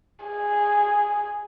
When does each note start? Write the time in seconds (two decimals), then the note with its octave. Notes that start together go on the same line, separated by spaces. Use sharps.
0.26 G#4